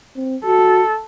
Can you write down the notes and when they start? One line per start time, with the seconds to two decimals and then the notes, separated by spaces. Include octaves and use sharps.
0.16 C4
0.45 F#4 A4